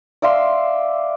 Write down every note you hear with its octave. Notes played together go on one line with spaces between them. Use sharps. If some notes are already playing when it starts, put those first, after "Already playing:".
D5 E5 F5 C6